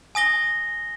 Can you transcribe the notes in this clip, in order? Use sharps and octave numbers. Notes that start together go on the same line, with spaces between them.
G#5 D#6 A#6 G7